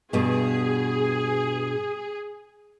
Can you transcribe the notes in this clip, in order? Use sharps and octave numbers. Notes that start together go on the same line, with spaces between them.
G2 B2 G#4